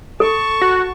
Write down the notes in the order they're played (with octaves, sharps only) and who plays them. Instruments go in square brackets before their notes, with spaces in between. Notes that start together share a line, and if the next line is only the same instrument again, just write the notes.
[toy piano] A4 [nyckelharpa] A5 C#6
[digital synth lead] F#4